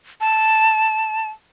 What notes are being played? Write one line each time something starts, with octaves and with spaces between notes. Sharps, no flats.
A5